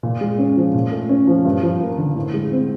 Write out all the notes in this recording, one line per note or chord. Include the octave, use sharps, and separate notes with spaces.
A#2
G#3
C#4
F3
A#2
A3
C#4
F3
G2
F3
A#3
D3
A2
G#3
C4